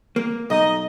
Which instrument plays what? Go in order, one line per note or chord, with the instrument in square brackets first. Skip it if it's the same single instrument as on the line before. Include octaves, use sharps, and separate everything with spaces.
[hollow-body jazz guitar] A#3
[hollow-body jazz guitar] B1 [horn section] D#4 D#5